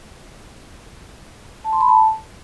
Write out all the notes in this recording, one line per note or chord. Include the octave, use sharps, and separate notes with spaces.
A5
C6
B5
A5